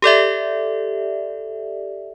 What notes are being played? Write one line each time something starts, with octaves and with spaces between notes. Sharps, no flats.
G4 A4 D5 E5